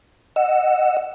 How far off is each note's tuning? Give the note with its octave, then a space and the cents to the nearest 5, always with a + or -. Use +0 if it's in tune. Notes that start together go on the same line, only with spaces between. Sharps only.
D#5 -15 F#5 +0 E6 +5